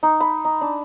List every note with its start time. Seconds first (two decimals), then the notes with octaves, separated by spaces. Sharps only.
0.03 D#4
0.20 B5
0.45 D#4
0.61 D4